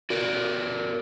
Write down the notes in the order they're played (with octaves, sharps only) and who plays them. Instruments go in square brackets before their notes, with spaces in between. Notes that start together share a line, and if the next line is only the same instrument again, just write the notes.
[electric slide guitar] F#4 A#4 D5